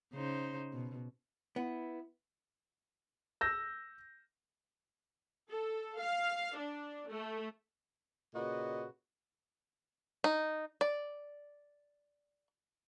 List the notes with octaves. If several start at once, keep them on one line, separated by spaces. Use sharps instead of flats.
C#3 D#4 C5
B2
B3 E4
E6 G6 A#6
A4
F5
D4
A3
A#2 C#3 F#4 B4 D#5
D#4
D5